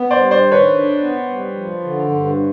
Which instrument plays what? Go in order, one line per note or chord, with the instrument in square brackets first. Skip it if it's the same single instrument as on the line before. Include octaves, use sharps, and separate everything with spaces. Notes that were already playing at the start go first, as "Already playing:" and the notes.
Already playing: [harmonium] B3
[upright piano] C5 D5
[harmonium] G3
[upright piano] C5 D5
[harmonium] D#3
[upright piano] B4 C#5
[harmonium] D4
B3
G3
F3
D3
G2